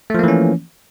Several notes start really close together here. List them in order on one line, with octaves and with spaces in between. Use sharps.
A3 F3 A#3 E3 C#4